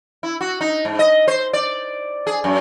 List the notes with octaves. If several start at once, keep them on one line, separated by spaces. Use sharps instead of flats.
E4
F#4
D#4
G#2
D#5
C5
D5
G#4
F#2